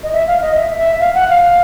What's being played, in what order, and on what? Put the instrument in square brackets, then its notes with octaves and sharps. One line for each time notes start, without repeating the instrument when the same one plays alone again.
[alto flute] D#5
E5
F5
D#5
E5
E5
F5
F#5
F5